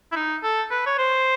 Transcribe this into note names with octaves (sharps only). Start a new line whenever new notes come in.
E4
D#4
A4
B4
C#5
C5